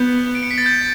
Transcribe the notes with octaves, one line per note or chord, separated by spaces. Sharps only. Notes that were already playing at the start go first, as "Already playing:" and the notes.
Already playing: B3 G6
D7
C#7
B6
A6
G6